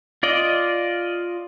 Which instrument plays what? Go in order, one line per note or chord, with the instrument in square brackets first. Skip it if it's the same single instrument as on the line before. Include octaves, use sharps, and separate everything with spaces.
[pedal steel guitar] F4 D5 D#5